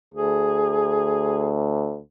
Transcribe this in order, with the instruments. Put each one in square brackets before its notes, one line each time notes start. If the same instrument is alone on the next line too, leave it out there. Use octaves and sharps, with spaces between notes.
[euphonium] D2 [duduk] G#4